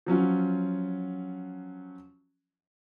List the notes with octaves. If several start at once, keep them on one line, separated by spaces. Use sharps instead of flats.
F3 F#3 C#4 F4